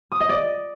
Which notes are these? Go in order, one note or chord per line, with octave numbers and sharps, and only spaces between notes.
D#6
D#5
D5